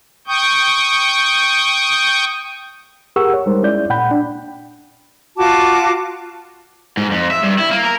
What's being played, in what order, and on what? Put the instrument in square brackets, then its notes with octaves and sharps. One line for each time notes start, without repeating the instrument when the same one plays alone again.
[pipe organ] G5 C#6 D#6 G6
[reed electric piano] G4 G#4 A#4 F#5 C#6 E6
C#5
G3 G#3 D#4 A#4 C5
G#3 C#4 E4 D5 G6
A#2 F#5 G5 B5 G6
D4
[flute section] F4 F#4 A5 D6
[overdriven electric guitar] G#2
F2
E5
G2
E4
A#3
A#4